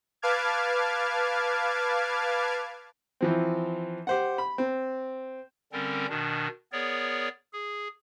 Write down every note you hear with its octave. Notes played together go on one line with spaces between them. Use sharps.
B4 F5 A5 D6 F6 G#6
E3 F3 C4
G4 C5 F#5
B5
C4
D3 G3 C4 C#4 A#4
B2 D#3 D4
B3 G#4 A#4 C#5 D5
G#4